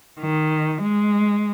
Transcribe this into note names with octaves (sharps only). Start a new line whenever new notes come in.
D#3
G#3